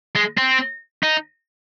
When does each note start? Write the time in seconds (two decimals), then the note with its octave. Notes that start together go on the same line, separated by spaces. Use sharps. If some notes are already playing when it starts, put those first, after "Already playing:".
0.15 G#3
0.37 C4
1.03 D#4